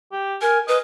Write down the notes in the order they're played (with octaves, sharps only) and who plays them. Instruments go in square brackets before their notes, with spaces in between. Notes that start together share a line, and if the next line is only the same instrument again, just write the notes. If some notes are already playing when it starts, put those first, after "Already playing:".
[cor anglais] G4
[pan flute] A#4 [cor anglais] G#5
[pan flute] B4 [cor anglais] D#5